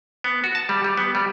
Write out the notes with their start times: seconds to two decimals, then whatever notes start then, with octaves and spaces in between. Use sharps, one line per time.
0.24 B3
0.44 F#4
0.55 A5
0.69 G3
0.84 G3
0.97 B3
1.15 G3